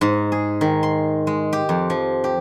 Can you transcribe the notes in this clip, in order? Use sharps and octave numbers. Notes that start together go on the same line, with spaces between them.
G#2
G#4
D#3
C6
G#3
G4
F2
F3
G4